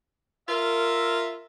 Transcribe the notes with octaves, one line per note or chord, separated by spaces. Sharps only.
F4 A#4 E5